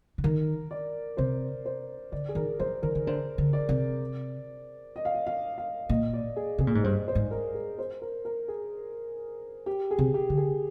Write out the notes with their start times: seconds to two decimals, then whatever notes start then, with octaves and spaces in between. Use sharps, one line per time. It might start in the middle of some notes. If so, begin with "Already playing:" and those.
0.18 D3
0.24 D#3 A#4
0.71 D5
1.17 C3 C5
1.66 C5
2.12 D3 D5
2.29 G#4
2.35 D#3 A#4
2.59 F3 C5
2.82 D#3 A#4
2.95 D#3
3.07 D3 C5
3.38 D3
3.53 D5
3.69 C3
4.96 D#5
5.05 F5
5.14 D#5
5.27 F5
5.58 F5
5.89 A#2 D#5
6.13 D5
6.36 G#4
6.58 C3 G#4
6.67 A#2
6.75 G#2
6.84 G2 C5
7.08 C5
7.15 G#2
7.31 A#4
7.54 G#4
7.78 C5
8.02 A#4
8.25 A#4
8.48 G#4
9.66 G4
9.91 G#4
9.99 C3
10.14 G4
10.30 D3
10.37 G#4